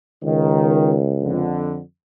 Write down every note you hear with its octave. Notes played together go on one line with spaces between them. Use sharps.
C#2 D#3
F2 D3